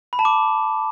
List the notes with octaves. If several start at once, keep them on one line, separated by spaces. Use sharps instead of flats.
B5
A5
D6